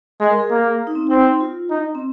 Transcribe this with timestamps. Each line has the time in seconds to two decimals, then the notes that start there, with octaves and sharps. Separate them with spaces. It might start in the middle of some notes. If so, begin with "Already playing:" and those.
0.20 G#3 G#4
0.30 A#4
0.40 G#4
0.51 A#3
0.87 D#4
0.95 C4
1.10 C4 D#4
1.41 F4
1.70 D#4
1.95 C4